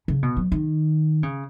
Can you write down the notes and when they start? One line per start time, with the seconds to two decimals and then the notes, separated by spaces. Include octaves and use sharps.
0.08 C#3
0.23 B2
0.37 F#3
0.52 D#3
1.23 C#3